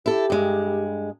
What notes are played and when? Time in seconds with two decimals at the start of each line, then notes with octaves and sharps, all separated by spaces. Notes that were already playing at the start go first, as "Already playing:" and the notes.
0.06 E4 G4 A4
0.30 G2 G#3